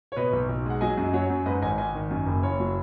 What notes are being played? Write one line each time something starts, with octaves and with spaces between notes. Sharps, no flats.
C#5
B2 B4 D#5
B1
B1
G#3 F#5
F#3 D#5 G#5
F#2
F#3 C#5 F#5
F#2
G#2 B4 D#5
G#1 D#5 G#5
G#1 D#5 G#5
D#3
F#2
F#1
F#1 C#5
F#3